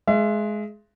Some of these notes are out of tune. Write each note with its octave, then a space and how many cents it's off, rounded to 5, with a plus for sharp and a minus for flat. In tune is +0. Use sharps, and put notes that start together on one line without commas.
G#3 +20 E5 +40